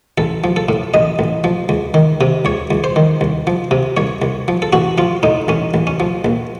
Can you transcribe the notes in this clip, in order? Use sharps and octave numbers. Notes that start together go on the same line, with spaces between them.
A1 A4
F3
A4
A2
A1 D#5
A1
F3
C#2
D#3
C3
C#2 C#5
C#2
C5
D#3
C2
F3
C3
C2 C#5
C2
F3
A4
A1 F#4
F3 F4
A2 D#4
A1 C#4
A1
C#4
F3
A#1